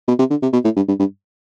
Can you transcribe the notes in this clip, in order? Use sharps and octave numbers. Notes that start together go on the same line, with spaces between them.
B2
C3
D3
C3
B2
A2
G2
G2
G2